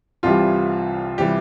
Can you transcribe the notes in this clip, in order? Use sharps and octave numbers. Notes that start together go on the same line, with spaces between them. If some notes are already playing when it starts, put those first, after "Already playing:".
C2 C3 E3 G3 F4
C3 E3 G3 G4